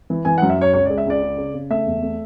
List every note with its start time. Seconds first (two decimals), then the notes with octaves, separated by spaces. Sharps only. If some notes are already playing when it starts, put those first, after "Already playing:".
0.10 E3
0.25 E3 G#5
0.38 F#5
0.42 F#2
0.50 E5
0.58 F#2 C#5
0.73 C#2 C#5
0.86 D5
0.90 G#3
0.98 E5
1.06 C#2 D5
1.22 C#3
1.37 C#3
1.54 C#3
1.70 A3 E5
1.86 E2
2.02 A3